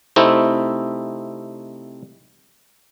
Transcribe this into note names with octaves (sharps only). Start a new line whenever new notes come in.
C3 A3 C4 D#4 E4